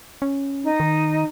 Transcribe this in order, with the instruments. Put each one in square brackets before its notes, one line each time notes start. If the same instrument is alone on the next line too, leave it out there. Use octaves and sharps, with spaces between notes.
[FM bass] C#4
[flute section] D#4
[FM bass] D#3